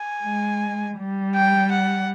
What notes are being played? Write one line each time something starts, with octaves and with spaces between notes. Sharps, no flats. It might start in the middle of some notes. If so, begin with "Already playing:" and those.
Already playing: G#5
G#3
G3
G5
F#5